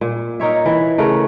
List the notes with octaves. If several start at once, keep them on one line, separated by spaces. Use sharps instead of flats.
A#2
D#4 A#4 C#5 E5
E3
C#3 A3 A#4 F#5